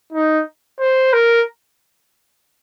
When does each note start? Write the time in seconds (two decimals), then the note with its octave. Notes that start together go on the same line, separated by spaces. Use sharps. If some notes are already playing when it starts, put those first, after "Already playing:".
0.13 D#4
0.80 C5
1.13 A#4